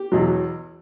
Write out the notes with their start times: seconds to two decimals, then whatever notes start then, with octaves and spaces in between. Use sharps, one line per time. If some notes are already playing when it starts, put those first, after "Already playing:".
Already playing: G4
0.12 E2 B2 F#3